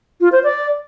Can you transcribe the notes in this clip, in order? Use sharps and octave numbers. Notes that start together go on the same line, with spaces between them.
F4
C5
D5